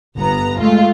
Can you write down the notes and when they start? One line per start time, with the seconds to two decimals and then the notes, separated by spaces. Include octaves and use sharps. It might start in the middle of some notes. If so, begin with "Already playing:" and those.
0.17 G1 B3 A#5
0.59 G#3 A3 F4